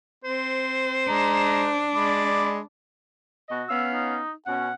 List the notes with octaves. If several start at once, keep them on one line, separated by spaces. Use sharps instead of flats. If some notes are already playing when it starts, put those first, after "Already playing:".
C4 C5
G#3 D4 A#5
G#3 D5 B5
B2 F#4 D#5
B3 C#4 F5 E6
D#4
B2 C#4 F#5